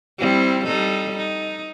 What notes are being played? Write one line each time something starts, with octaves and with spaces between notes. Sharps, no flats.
G3 C4 E4
G3 D#4 A4
D#4